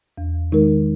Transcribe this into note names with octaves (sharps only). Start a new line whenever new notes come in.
E2
D#3 G#3 D#4 A#4